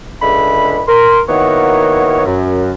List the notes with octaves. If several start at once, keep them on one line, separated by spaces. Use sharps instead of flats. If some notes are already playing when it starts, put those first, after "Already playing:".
C#2 D3 G#3 E5 B5
A#4 C6
D#3 A#3 B3 E4 F#4 C#5
F#2